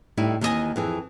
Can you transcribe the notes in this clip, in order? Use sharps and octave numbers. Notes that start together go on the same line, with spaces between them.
A2 G3 D#4 E4
D#2 D#3 E3 D4 D#5 G#5
F2 E3 G#4